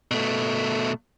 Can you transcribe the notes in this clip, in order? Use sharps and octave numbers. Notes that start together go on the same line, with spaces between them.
B2 A3